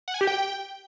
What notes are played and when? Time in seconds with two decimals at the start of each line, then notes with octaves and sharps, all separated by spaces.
0.08 F#5
0.14 G#5
0.21 G4
0.27 G5